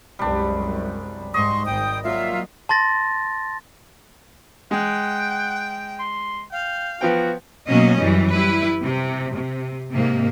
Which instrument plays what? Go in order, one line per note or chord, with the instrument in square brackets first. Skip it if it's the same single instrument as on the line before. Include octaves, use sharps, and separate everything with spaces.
[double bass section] C2 F#2 G#3 [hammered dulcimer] G3 D4
[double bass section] G#2 [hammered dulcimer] D#5 [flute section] C6 C#6
[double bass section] G#1 [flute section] G5 D#6
[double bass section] F#3 A#3 [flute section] F4 E5
[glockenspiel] A5 C6 A6 A#6
[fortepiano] G#3 [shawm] F#5 [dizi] G5
[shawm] C6
[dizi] F5 [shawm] G5
[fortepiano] F3 B3 G5 [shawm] F#4
[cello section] B2 F#3 A#3 C#4 D#5
F#2 E3 G3
G3 E4 B4
C3
C3
G#2 C3 A#3